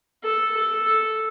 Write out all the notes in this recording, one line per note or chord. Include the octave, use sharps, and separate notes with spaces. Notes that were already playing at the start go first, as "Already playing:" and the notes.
A4
A4